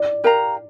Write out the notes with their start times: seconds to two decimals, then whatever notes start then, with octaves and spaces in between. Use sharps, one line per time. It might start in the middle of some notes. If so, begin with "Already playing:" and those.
Already playing: D5
0.24 G4 A#4 F5 A#5